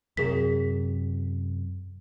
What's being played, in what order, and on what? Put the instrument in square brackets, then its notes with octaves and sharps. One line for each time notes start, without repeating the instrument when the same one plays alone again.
[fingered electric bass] F#2 C3 [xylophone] G#4 A#4 B6